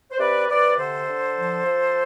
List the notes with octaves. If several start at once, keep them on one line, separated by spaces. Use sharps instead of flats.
C5
C3 B4 D5
C3 B4 D5
D3 A4 C5
D3
F3
F3